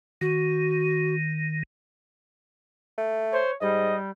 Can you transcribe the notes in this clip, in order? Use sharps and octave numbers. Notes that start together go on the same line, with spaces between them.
D#3 F#4
A3
C5 C#5
G#2 G3 D#5